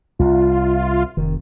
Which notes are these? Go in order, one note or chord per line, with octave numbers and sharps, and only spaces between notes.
C2 F4
F1 D#3